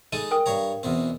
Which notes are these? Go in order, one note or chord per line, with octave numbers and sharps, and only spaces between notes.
G#3 D#4 A4 D#7
A#4 G5 D#6
G2 C#5 A#5
E2 B2 C4